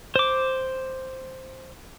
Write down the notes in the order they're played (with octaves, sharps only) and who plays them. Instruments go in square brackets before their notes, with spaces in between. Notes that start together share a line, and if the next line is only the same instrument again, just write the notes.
[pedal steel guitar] C5 D6